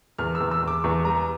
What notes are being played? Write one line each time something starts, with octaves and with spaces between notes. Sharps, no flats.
E2 F6
E6
E2
E6
E2
D6
E2 C#6
G3 A#5